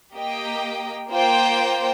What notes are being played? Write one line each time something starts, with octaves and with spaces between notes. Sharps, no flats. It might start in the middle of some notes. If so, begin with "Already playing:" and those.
A#3 G4 D#5 G5
A#3 F4 C5 G5